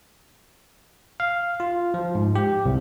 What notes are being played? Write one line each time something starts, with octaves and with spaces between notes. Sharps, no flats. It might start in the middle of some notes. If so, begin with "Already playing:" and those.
F5
F4
F3
G#2
G4
C2